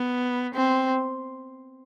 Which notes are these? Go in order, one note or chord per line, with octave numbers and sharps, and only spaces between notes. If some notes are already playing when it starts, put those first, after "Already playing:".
Already playing: B3
C4